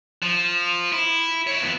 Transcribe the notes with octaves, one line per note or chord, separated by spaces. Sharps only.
F3
E4
C#5 E5
F2 B3